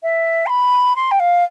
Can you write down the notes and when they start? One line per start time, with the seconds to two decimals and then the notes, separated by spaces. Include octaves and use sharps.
0.03 E5
0.46 C6
0.49 B5
0.96 C6
1.11 G5
1.19 F5